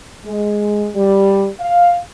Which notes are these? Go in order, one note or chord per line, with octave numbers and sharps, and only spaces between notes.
G#3
G3
F5